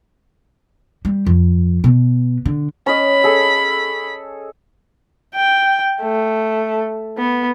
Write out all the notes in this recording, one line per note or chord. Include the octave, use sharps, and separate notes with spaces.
G3
F2
B2
D3
C#4 D#5 B5
G#4 A4
G5
A3
B3